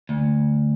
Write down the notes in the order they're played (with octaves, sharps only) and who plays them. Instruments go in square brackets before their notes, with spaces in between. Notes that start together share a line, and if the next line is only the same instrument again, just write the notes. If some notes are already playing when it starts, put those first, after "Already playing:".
[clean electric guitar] D2